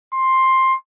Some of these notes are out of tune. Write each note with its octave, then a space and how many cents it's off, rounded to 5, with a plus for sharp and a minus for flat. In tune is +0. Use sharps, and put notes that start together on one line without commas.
C6 +10